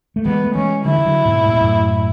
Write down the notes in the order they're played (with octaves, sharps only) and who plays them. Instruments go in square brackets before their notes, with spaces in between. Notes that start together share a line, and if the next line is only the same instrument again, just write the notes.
[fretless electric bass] A3
[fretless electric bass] E3 G#3 [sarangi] B3
[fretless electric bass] A3
[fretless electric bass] E3 G#3 [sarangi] C#4
[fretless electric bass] D3 F#3 [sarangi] E4
[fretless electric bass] E3
D3 F#3
G#2 B2
A2
B2
F#2 A2